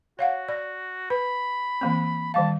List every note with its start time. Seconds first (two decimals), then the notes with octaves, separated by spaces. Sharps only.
0.19 F#4 C#5 F5 F#5
0.49 D5
1.10 B4 B5
1.81 E3 A#3 C4
2.34 D#3 G3 F5 A5